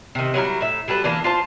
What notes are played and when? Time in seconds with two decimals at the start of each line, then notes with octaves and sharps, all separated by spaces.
0.15 C3 D#3
0.34 F#3 G3 E4 A#4
0.61 A2 E5
0.88 F#3 G3 A4 B4
1.04 E3 A#3 D4
1.24 F4 C5 A5